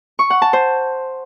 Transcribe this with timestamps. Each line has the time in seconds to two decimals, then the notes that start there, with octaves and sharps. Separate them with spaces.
0.19 C#6
0.30 F#5
0.42 A5
0.53 C5